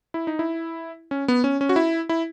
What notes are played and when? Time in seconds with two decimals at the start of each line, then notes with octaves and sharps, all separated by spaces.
0.14 E4
0.27 D#4
0.39 E4
1.11 C#4
1.28 B3
1.44 C#4
1.61 C#4
1.69 F#4
1.76 E4
2.09 E4